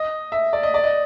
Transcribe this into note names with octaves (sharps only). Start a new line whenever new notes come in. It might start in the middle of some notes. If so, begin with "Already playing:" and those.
Already playing: D#5
E5
D5
D#5
D5
D#5